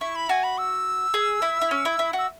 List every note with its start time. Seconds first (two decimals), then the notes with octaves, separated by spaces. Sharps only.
0.01 E4 C#6
0.16 B5
0.29 F#4 G#5
0.44 B5
0.58 E6
1.14 G#4
1.42 E4
1.62 E4
1.71 C#4
1.85 E4
1.99 E4
2.13 F#4
2.18 E6